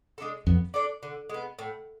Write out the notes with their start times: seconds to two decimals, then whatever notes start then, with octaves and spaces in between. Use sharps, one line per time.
0.18 G#3 D4 A4
0.47 F2 B3
0.74 D4 A4 D5
1.03 D3
1.30 G#3 B3
1.59 A2